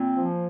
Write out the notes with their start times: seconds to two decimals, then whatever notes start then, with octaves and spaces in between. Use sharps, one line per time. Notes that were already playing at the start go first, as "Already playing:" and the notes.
Already playing: A#2 C4
0.17 F3